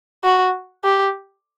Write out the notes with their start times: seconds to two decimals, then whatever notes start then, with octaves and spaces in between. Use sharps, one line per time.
0.24 F#4
0.84 G4